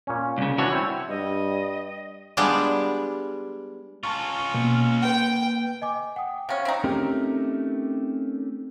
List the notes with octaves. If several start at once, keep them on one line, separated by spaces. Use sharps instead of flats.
A#2 C#4
C2 C#3
E3 D4 F#4 C#5
C4 E4
G2 D#5
G3 G#3 B3 D4 F4 G4
C#4 F4 A5 A#5 C#6
B2 A#3
B4 G5
D#5 G#5 D6
F#5 G5 D#6
C3 C#4 F5
C4 D#4
A3 C4 C#4 D#4 G4 A#4